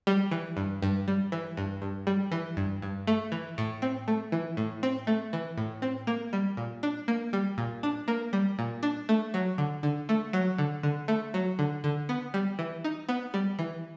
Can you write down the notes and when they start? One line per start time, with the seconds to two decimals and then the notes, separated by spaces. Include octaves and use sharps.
0.07 G3
0.31 E3
0.57 G2
0.82 G2
1.08 G3
1.32 E3
1.57 G2
1.82 G2
2.07 G3
2.32 E3
2.57 G2
2.82 G2
3.07 A3
3.32 E3
3.58 A2
3.82 C4
4.08 A3
4.32 E3
4.57 A2
4.83 C4
5.07 A3
5.33 E3
5.58 A2
5.82 C4
6.07 A#3
6.33 G3
6.57 A#2
6.83 D4
7.08 A#3
7.33 G3
7.58 A#2
7.83 D4
8.08 A#3
8.33 G3
8.59 A#2
8.83 D4
9.09 A3
9.34 F#3
9.58 D3
9.83 D3
10.09 A3
10.33 F#3
10.58 D3
10.83 D3
11.08 A3
11.34 F#3
11.59 D3
11.84 D3
12.09 B3
12.34 G3
12.59 E3
12.84 D#4
13.09 B3
13.34 G3
13.59 E3